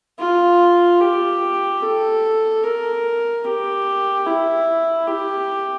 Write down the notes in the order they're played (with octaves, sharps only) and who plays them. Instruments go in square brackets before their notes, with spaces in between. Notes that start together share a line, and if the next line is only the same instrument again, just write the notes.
[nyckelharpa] F4
G4
A4
A#4
G4
E4
G4